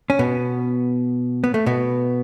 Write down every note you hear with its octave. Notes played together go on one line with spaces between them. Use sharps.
C#4
B2 B3
B3
A3
B2 B3